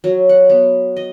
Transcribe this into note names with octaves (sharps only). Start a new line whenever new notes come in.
F#3
F#5
B3
D#5